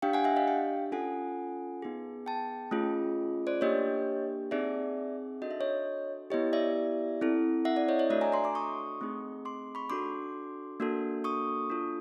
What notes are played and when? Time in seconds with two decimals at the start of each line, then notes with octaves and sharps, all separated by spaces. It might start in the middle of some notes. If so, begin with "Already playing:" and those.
0.02 D4 G4 F5 G5
0.13 F#5 G#5
0.24 E5 F#5
0.36 D#5 F5
0.47 F5 G5
0.92 C#4 F4 A4 F#5 G#5
1.82 B3 D#4 G#4
2.26 G5 A5
2.71 A3 C#4 F4 G#4
3.47 C5 D5
3.61 A#3 D4 G4 C#5 D#5
4.51 C4 D#4 G#4 D5 E5
5.41 D4 F#4 A4 D#5
5.51 E5
5.61 C#5 D#5
6.30 B3 E4 G4 C#5 D#5
6.53 D5 E5
7.21 C4 E4 A4
7.65 E5 F#5
7.76 D5 E5
7.89 C#5 D#5
7.99 C#5 D#5
8.10 A3 D4 F#4 A4 D5 E5
8.21 G#5 A#5
8.32 A#5 C6
8.44 C6 D6
8.55 C#6 D#6
9.01 A3 C4 D#4 G#4
9.45 C6 D6
9.75 B5 C#6
9.90 D4 F#4 A4 C6 D6
10.80 A#3 D4 F#4 A4
11.24 C#6 D#6
11.70 D4 F4 A4